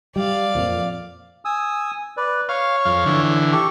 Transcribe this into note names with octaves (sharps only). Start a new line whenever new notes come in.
G3 D5 F5
F2 A#2 F3
G#5 D#6 E6
B4 D5
C#5 F5 C#6
F2 F5
D3 E3
G4 A4 C#6